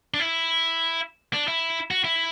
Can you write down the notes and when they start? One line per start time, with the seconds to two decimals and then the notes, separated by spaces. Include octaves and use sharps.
0.14 D4
0.20 E4
1.34 D4
1.48 E4
1.91 F#4
2.05 E4